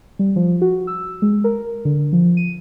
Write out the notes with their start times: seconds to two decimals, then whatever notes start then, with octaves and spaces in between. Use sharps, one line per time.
0.19 G3
0.36 F3
0.62 F#4
0.87 E6
1.22 G#3
1.44 A#4
1.85 D3
2.13 F3
2.37 D#7